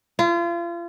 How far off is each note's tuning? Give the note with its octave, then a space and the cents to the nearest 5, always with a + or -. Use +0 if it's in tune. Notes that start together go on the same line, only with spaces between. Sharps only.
F4 -35